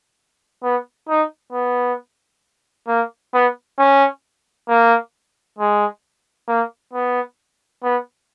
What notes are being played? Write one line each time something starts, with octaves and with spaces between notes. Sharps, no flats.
B3
D#4
B3
A#3
B3
C#4
A#3
G#3
A#3
B3
B3